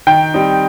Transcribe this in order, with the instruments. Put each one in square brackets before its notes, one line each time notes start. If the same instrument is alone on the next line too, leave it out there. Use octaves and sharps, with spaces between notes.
[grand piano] D#3 [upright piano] G5
[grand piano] G3 C4 D#4